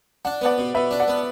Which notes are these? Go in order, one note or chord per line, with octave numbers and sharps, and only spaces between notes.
D4 F#5
B3 D5 F#5
B2
B2 B4 E5
D4
D5 F#5
B3